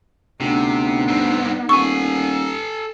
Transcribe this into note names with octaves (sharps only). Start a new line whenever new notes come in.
D2 C3 B3 D#4
G2 C4
D#1 A4 G#5 C#6